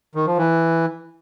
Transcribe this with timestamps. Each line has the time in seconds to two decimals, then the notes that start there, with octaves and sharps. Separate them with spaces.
0.15 D#3
0.27 F3
0.38 E3